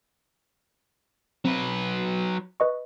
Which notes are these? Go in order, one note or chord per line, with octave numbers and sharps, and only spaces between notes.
F#3 C4 B4
B4 D#5 C#6